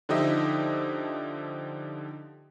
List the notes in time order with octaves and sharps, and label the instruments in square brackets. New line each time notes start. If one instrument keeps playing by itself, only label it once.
[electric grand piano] D3 F3 D#4 G4 D#5 E5